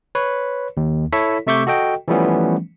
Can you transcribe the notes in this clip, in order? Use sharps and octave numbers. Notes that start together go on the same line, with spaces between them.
B4 C#5
D#2
E4 A4 C#5 B6
C3 A3 E5 C#6 D6 G6
F#4 A4 D#5 G5
E3 F3 G3 A3 B3 C#4